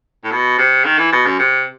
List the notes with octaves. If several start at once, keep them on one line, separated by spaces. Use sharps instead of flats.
A2
B2
C3
D#3
E3
B2
F#2
C3